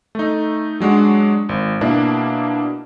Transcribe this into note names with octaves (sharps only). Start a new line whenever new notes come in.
A3 D#4
F#3 G#3 D4 F#4
G#1
B2 A#3 D4 E4